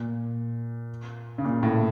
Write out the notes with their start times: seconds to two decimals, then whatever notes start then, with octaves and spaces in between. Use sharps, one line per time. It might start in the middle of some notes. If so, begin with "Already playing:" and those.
Already playing: A#2
1.38 C#3
1.44 A#2
1.63 A2